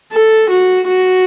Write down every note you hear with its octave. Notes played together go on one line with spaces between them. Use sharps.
A4
F#4
F#4